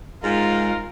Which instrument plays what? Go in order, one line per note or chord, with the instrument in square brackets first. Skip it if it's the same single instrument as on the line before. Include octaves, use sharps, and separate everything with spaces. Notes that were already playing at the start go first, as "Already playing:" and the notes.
[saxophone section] G#2 [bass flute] G#3 [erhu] F4 [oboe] A#4